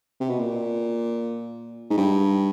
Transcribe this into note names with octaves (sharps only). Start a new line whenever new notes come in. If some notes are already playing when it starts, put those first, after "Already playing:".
C3
B2
A#2
G#2
G2